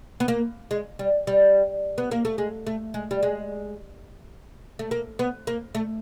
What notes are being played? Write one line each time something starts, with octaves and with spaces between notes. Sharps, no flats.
B3
A#3
G#3
G3
G3
B3
A#3
A3
G#3
A3
G#3
G3
G#3
A3
A#3
B3
A#3
A3